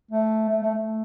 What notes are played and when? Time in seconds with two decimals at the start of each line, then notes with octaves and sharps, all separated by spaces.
0.11 A3
0.49 A3
0.63 A3
0.75 A3